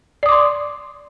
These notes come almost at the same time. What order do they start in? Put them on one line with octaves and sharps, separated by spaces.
D5 D#6 D6 C6